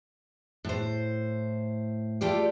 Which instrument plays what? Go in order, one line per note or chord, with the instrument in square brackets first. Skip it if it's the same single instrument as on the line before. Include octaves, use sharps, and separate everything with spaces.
[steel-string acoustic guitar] A2 C5
A3 F4 G4 D5